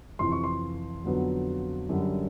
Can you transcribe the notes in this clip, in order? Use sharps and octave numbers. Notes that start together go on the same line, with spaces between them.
F2 C3 E3 C6
C#6
C6
F2 D3 F#3 B3
F#2 D3 G3